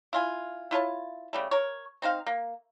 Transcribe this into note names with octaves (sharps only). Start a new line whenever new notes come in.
E4 F4 G#5
E4 F4 C#5 A5
C#3 G3 A3
A#4 C#5
C4 D#4 C5 F5
A#3